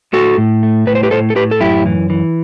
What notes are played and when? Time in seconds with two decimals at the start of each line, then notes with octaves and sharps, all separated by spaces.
0.13 A2 F#4 A4
0.38 A2
0.63 A3
0.87 A2 B4
0.95 C5
1.03 G4 B4
1.11 A2 A4 C5
1.30 A4
1.35 A2 G4 B4
1.51 A4
1.60 F#2 E4 G4
1.86 E3
2.10 E3